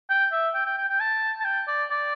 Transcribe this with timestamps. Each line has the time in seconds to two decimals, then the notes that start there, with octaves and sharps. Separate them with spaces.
0.09 G5
0.32 E5
0.54 G5
0.66 G5
0.78 G5
0.89 G5
1.00 A5
1.41 A5
1.45 G5
1.67 D5
1.91 D5